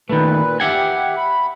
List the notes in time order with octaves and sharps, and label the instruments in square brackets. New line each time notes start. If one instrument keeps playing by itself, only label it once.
[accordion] A#2 B4 [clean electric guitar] D#3 A3
[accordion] G4 [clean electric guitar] E5 F#5 G#5
[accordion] B5